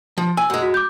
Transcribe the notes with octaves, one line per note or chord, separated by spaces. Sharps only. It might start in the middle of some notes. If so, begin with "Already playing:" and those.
F3
G#5 E6
F#2 G#3
F#4
D6 G6